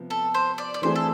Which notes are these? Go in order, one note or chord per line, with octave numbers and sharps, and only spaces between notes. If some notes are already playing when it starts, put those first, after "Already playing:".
Already playing: C3 F3 B3
A4
C5
D5
D5
E3 A3 C4 G#4 C5
A4